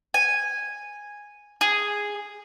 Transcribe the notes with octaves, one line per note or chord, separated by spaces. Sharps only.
G#5
G#4